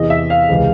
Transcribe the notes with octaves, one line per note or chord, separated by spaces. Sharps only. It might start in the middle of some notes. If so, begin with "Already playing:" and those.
Already playing: E2 C3 E3 D#5
E5
F5
C#2 C3 E3